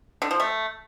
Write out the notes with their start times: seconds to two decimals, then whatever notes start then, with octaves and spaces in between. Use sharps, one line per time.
0.22 D3
0.31 F3
0.40 A3